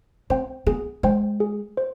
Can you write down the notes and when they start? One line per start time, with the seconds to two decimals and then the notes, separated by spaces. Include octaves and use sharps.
0.30 C4 C5 G5
0.67 B3 G#4
1.03 G#3 C5 G5
1.40 G#4
1.77 C5